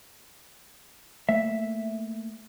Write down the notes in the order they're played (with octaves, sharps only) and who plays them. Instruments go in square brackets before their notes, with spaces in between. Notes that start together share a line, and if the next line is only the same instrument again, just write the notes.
[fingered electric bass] A3 A#3 [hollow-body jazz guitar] E5